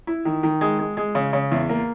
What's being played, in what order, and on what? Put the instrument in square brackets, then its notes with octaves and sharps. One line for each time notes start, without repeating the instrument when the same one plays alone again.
[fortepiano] E4
D#3
D#3
G#3
G#3
G#3
C#3
C#3
E2
A#3